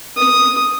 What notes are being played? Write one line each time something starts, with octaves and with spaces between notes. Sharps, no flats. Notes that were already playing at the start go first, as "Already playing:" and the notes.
D#6